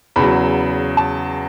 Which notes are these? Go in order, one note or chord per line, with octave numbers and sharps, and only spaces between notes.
E2 C#3 F#3 B5
A5